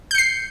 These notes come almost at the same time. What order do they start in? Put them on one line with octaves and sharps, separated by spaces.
G6 C#7 C7